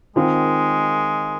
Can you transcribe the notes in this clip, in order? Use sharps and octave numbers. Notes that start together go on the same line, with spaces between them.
D#3 G#3 C4 F4